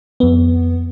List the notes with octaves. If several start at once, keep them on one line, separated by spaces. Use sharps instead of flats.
F2 B3